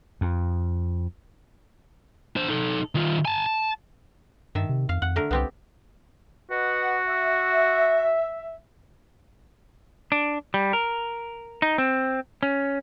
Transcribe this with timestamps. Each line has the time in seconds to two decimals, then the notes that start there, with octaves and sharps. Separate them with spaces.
0.21 F2
2.36 D4 C5
2.48 D#4 A4
2.95 D#3 F4
3.25 G#5 A5
3.46 A5
4.55 G2 D#3 E5 A5
4.69 C3
4.89 F2 F5
5.02 F2 F#5
5.16 D3 A3 A#4
5.31 C2 B3 C4 G4
6.51 F#4 B4 D#5 F#5
7.08 E5
10.12 D4
10.54 G3
10.73 A#4
11.62 D#4
11.78 C4
12.43 C#4